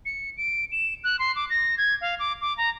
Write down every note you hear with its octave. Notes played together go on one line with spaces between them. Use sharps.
C#7
D7
E7
F#6
C6
D6
A#6
G#6
F5
D6
D6
A#5